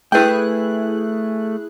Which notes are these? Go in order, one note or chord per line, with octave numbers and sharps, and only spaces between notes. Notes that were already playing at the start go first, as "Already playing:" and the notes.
A3 E4 G#4 B4 G5 F#6